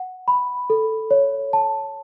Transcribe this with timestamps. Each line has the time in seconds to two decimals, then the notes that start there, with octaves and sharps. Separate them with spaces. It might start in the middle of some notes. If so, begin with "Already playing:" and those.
Already playing: F#5
0.28 B5
0.70 A4
1.11 C#5
1.53 A5